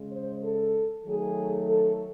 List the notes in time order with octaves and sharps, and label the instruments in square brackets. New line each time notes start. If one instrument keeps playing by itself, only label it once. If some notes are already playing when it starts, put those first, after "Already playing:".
Already playing: [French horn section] C#3 G#3
C5
A4
D#3 F#3 A3 G#4
A4